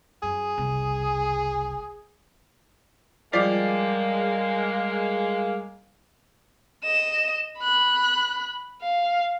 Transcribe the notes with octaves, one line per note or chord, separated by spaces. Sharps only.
F#2 G#4
F#1 C2
F3 G3 G#3 A#3 D5 C7
D#5 E7
B5 F#6
F5